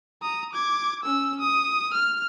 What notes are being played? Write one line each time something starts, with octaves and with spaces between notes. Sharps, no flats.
A#5 D#6
D6 G#6
C#4 E6
D#6
F6